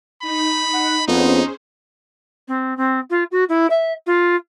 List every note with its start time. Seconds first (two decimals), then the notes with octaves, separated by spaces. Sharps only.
0.22 D#4 B5
0.73 F#5
1.08 F2 B3 C#4 D#4 G#4 C5
2.48 C4
2.77 C4
3.10 F4
3.31 F#4
3.49 E4
3.70 E5
4.06 F4